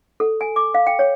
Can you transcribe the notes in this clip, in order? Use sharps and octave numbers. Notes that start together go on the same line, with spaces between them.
A4
G#5
D6
F5
G5
C#5